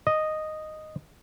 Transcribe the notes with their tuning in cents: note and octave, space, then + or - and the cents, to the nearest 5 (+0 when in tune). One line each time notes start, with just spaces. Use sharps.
D#5 -5